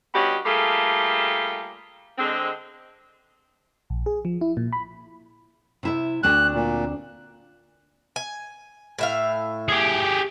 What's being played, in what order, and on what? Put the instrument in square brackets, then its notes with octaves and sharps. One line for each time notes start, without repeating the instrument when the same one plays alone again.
[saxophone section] G2 B3 C#4 F#4 G4 D#5
G3 A3 A#3 F4 G#4 A4
D3 G#3 C4
[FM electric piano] A#1
G#4
F3
E4
A#2
B5
[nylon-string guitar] C3 E4 E5
[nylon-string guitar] D2 C4 D4 [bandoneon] F#6
[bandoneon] A#2
[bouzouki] G#5
A2 E5 F5
[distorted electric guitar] G4 G#4